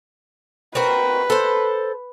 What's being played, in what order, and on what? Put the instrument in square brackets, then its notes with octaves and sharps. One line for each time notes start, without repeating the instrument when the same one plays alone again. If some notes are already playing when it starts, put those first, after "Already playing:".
[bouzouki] C4 F#4 A#4 [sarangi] B4
[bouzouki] A4 C5